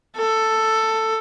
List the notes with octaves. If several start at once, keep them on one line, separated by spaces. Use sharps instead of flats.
A4